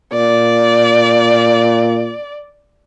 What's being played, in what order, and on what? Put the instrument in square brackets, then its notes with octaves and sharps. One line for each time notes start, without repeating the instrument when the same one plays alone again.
[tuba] A#2 [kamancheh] D5